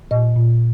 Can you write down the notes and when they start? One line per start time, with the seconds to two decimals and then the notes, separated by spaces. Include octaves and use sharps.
0.11 A#2 D#5
0.37 A#2